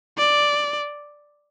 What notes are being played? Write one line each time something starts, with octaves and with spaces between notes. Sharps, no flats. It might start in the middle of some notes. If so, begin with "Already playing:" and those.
D5